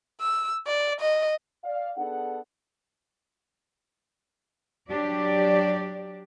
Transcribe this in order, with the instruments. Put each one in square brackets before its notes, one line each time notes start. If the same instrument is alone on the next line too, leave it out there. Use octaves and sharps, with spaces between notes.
[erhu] E6
D5
D#5
[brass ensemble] D5 F5
B3 D4 G#4 A4 F#5
[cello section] F#3 D4 G4 D5